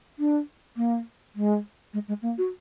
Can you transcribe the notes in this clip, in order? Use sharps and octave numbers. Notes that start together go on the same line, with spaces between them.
D4
A#3
G#3
G#3
G#3
A#3
F#4